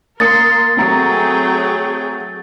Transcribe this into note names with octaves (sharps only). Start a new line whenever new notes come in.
A#3 A#4 C6 D#6 A6 C#7
F#3 A3 C4 G#4 G5 A#5